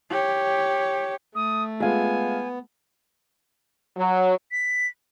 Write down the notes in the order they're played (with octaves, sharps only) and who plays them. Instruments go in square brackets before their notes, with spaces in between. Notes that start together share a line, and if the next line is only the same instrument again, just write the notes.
[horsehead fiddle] G4 C#5
[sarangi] A3 [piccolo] D#6
[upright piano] G#3 F4 [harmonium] B3 [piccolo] G#5
[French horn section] F#3
[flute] B6